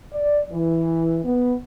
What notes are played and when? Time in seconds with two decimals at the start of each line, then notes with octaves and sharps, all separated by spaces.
0.12 D5
0.50 E3
1.24 B3